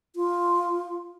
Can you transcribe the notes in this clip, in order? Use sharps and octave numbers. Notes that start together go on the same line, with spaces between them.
F4